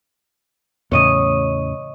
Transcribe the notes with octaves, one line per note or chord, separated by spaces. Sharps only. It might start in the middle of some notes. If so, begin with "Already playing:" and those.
E2 A2 C#3 C#5 D#5 D#6